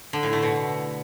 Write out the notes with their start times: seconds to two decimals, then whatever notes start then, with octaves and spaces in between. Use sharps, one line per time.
0.13 D3
0.23 A2
0.33 A3
0.43 B2